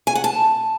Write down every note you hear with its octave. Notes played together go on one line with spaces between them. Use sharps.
G#5
F#5
A5